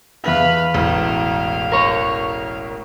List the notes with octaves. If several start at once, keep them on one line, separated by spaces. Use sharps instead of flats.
E2 B3 B4 E5 F5
E1 A1 F5
A#4 C#5